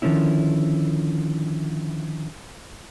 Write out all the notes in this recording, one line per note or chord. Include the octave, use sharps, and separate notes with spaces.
D3 D#3 F3 A#3 C#4 E4